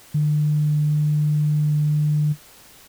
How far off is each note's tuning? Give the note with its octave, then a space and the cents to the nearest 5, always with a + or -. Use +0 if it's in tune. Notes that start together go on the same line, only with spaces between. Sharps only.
D3 +35